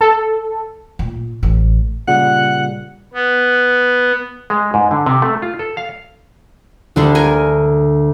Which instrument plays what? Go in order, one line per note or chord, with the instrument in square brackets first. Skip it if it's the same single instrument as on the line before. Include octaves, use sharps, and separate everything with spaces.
[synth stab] A4
[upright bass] A#2
A1
[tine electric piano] A#2 C#3 G3 [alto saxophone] F#5
[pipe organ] B3
[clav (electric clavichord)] G#3
G#2
D3
C3
A3
F4
A4
F5
[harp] D2 [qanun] D3 G3 D4
[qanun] A#4 G#5